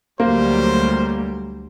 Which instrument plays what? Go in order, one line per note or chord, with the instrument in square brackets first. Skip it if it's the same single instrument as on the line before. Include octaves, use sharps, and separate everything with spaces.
[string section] D2 F#3 G3 [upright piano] A#3 [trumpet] C5